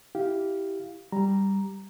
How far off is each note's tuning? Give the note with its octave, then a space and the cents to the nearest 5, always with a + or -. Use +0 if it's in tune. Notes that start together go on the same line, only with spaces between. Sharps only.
E4 -5 G4 -10 F5 +0
G3 +0 A#5 +0